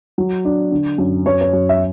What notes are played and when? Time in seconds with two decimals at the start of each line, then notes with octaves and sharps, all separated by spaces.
0.18 F#3
0.45 D4
0.72 D3
0.98 F#2
1.26 F#2 C#5
1.41 C#5
1.53 F#2
1.69 E5